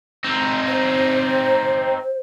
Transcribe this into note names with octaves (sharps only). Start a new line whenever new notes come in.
C4 D#4
C5